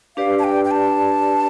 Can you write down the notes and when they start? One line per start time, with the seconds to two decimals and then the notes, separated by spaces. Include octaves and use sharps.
0.17 D4 G4 B4 D5 F5
0.39 A5
0.44 G5
0.65 G5
0.71 A5